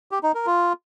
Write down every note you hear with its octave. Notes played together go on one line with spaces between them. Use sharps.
G4
D#4
A#4
F4